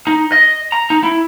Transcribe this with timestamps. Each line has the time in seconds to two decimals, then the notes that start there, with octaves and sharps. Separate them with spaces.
0.07 D#4
0.32 D#5
0.72 A#5
0.90 D#4
1.03 E4